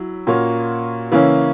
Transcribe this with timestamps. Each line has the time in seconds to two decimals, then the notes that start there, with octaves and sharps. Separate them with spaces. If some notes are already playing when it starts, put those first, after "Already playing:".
Already playing: F#3 E4
0.27 A#2 A#3 C#4 F#4 C#5
1.12 C#3 E3 A#3 C#4 E4